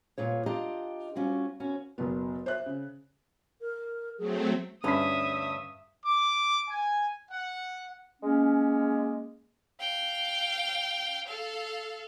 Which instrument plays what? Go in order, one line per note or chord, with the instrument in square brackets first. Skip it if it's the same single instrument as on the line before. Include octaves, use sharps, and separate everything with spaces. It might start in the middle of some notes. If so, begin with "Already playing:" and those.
[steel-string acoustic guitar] D2 G2 A#2 F4 C#5
D4 F4 G4 D#5 G5 A#5
G3 C#4 F4 F#4
D#2 C#4 F#4
[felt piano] F#1 B2 B3
C5 E5 F#6
C#3
[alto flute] A#4
[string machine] F#3 A3 C4 [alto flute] G#4
[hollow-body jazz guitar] D2 C#4 [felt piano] G2 B5 B6 [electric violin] E5 D#6
[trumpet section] D6
G#5
F#5
[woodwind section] G#3 A#3 C#4
[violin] F5 G5
A4 F5